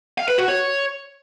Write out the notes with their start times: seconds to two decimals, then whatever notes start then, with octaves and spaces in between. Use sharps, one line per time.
0.18 F5
0.28 B4
0.38 F#4
0.48 C#5